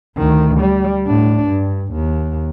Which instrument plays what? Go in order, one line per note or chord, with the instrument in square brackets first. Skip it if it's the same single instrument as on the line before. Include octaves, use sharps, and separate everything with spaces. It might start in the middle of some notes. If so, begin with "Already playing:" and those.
[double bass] D2 D#3
G3
A2 D4
G2
D#2